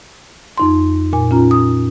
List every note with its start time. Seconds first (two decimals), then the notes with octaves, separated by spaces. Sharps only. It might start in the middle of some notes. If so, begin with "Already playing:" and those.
0.58 F2 D#4 C6
1.13 A#2 G#5
1.31 C#4 F4 A#5
1.51 D#6